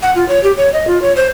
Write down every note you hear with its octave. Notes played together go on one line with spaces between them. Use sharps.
F#5
F4
C#5
G4
C#5
D#5
F4
C#5
C5